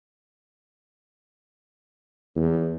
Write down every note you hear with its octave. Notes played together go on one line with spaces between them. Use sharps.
E2